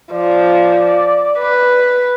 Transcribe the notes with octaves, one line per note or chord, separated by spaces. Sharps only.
F3 D5
B4